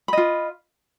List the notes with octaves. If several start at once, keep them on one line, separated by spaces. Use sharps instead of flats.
F4 D#5 B5